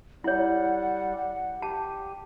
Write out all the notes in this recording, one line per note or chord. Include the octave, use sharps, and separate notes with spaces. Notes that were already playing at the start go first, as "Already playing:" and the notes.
G3 E4 C#5 F#5
G4 A5